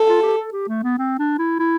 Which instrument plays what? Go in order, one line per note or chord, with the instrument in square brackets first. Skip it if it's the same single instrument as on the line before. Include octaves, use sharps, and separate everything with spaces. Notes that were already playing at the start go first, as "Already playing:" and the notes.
Already playing: [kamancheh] A4
[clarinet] F4
G4
A4
G4
A3
B3
C4
D4
E4
E4